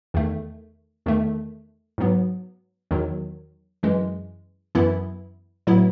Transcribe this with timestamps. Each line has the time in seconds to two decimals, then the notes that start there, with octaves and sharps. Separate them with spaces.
0.14 E2 D#3 A3
1.06 E2 D#3 A3
1.98 G#2 F#3 B3
2.91 E2 D#3 F#3
3.83 F#2 E3 G#3
4.75 F#2 E3 B3 E4
5.67 A2 F#3 B3 E4